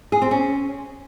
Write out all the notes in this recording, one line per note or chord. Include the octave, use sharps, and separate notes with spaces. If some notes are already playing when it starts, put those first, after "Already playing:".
G#4
C4
C#4